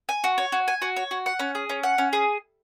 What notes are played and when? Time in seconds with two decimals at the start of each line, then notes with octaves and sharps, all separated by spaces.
0.09 G#5
0.24 F#4
0.38 C#5
0.52 F#4
0.68 G#5
0.82 F#4
0.96 C#5
1.11 F#4
1.26 F#5
1.39 C#4
1.55 G#4
1.70 C#4
1.83 F#5
1.98 C#4
2.13 G#4